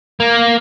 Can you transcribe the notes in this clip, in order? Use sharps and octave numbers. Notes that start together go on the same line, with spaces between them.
A#3